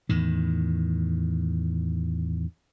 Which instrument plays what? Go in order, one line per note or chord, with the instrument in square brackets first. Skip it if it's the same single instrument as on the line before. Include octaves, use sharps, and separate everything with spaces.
[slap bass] E2 A2 D#3